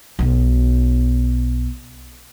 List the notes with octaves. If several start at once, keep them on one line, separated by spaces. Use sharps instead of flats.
B1 B3